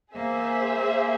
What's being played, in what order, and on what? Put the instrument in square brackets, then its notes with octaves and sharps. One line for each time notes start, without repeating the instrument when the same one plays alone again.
[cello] A#3 [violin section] G#4 C5 E5
[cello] A#3